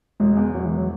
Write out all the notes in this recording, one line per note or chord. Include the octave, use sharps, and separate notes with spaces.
E1 G#3
E2
E1 F#3
E3
F#3